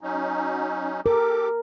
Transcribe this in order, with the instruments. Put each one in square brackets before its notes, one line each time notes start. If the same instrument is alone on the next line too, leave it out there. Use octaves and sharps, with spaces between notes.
[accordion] F#3 C#4 D#4
[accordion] G4 A4 D6 [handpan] A#4